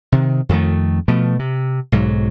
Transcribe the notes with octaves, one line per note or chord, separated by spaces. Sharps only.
C3 D#3
F2 D#3 A3
B2 F3 A3
C3
B1 G#2 F#3